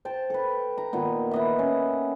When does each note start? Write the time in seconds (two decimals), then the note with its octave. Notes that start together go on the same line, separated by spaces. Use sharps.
0.05 C5 G5 A5
0.30 A4 B4
0.78 A#5
0.93 A#2 D#3 B3
1.31 B4 D#5 E5
1.59 C#4